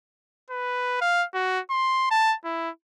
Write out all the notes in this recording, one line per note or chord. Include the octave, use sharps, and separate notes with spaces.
B4
F5
F#4
C6
A5
E4